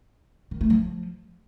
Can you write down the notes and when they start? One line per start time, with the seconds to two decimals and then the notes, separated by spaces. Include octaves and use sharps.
0.51 D#3
0.61 A3
0.70 F3